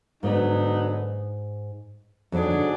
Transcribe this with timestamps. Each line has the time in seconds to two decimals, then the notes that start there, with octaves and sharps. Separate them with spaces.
0.23 G#2 D3 F#3 B3 D#4
2.32 F2 G#2 F#3 D4 G#4
2.50 D3